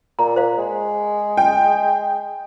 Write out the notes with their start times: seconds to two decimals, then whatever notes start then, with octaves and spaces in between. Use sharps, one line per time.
0.19 A#2 A#5
0.36 C5 F5
0.58 G#3
1.37 G5